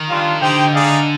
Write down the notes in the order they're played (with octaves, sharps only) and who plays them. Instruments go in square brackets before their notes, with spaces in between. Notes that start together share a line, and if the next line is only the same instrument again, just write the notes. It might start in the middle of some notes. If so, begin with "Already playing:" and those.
Already playing: [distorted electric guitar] D#3
[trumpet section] G3 D4 F4
[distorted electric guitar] D3 [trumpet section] D#4 G4 C5 G5
[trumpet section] G#3 D#4 G#4 D5 F5